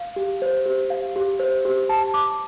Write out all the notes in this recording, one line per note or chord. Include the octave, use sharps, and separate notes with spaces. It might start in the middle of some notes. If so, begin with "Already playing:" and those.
Already playing: F5
G4
C5
G4
F5
G4
C5
G4
A5
D6